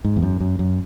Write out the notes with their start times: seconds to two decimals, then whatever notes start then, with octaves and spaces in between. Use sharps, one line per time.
0.05 G#2
0.16 E2
0.23 F#2
0.40 F#2
0.59 F#2